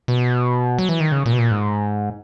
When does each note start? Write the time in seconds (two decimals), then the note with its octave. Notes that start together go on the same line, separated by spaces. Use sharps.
0.08 B2
0.79 F#3
0.89 E3
1.00 D#3
1.12 C#3
1.26 A#2
1.32 B2
1.38 A#2
1.51 G#2